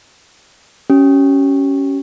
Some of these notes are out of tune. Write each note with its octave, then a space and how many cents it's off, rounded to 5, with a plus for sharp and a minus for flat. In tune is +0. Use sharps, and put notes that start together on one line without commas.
C#4 +0 G4 -35